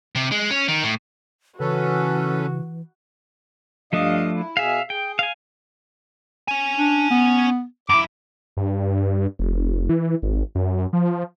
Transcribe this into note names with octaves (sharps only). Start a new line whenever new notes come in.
C3
G#3
C#4
D#3
A2
C#3 E3 C#4 F#4 A4 B4
G2 F3 A3 D4 D#5 F5
E4
B2 G#4 E5 F5 G#5
G#4 G5
F5 G#5
C#4 G#5
D4
B3
F#2 E4 D6
G2
F1
E3
G#1
F#2
F3